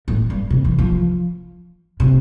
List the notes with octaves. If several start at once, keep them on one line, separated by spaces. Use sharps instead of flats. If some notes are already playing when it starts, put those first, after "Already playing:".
A2
G2
C3
E3
F3
C3